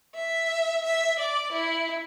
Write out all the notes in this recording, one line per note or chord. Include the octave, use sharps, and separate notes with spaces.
E5
E5
D5
E4